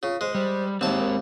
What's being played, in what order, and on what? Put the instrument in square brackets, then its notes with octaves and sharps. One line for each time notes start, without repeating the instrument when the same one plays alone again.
[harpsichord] C#3 [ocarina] F4
[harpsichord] G#3 [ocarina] C5
[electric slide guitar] G3 [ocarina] C5
[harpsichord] D#2 A5 [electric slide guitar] G#3 C4 [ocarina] D#4
[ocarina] A#4